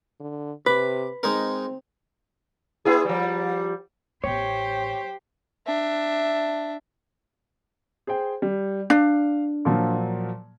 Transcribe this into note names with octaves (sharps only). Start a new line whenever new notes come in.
D3
C3 B4 D6
G#3 C4 D#4 A#4
B3 E4 G#4
F3 G3
A1 B3 G4 C5 C#5
D4 E5
G#4 C5 G5
G3
D4 F5
A#2 F3 F#3